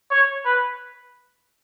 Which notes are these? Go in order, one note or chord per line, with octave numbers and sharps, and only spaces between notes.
C#5
B4